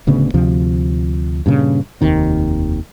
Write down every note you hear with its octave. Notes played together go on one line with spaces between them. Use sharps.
D1 D2 C#3 B3
D2 C3 F3
G2 A#2 C#3
F1 D#2 D#3 C4